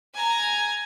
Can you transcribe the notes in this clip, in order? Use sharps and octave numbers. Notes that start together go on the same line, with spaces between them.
G#5 A#5